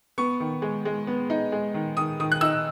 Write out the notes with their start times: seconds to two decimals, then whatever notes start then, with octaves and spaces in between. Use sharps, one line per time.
0.18 B3 C#6
0.40 D#3
0.62 G#3
0.85 G#3
1.07 B3
1.30 D#4
1.52 G#3
1.74 D#3
1.97 D#3 D#6
2.20 D#3 D#6
2.32 F#6
2.41 D#4 E6